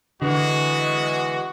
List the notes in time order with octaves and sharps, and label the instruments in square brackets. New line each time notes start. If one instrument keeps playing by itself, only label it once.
[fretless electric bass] D3 [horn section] E3 G#3 [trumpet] F#4